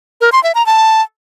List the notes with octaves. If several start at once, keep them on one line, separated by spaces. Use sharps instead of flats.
A#4
C6
E5
A#5
A5